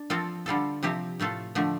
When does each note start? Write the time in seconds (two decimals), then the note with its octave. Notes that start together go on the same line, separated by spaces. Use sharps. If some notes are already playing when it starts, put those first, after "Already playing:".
Already playing: D4
0.10 F3 C4 F4 A4
0.46 D3 G3 F4 A4
0.83 C3 F3 C4 G4
1.20 A2 A3 F4 A4
1.55 D3 F3 A3